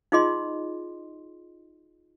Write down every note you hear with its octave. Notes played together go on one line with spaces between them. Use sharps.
D#4 F4 G#4 D#5 C6